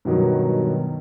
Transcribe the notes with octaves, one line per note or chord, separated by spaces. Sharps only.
G2 B2 D#3 F#3